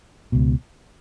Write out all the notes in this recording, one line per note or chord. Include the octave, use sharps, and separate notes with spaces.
C#2 B2